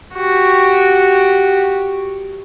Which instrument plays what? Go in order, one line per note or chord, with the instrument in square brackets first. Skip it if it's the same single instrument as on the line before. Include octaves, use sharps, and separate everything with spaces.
[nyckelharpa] F#4 G4